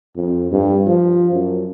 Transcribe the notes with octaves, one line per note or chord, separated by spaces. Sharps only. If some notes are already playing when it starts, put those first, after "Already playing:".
F2
G2
F3
F#2